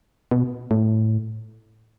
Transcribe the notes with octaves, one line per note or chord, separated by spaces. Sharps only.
B2
A2